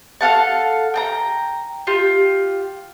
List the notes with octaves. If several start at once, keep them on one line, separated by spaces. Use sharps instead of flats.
A4 F5 F#5 A5
G5 A5 A#5
F4 G4